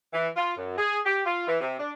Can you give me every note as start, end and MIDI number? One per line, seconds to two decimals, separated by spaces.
0.13 0.28 52
0.36 0.56 65
0.57 0.76 42
0.78 0.98 68
1.05 1.21 67
1.25 1.46 65
1.47 1.57 52
1.61 1.76 48
1.79 1.91 62